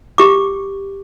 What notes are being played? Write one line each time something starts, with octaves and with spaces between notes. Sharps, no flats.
G4 D6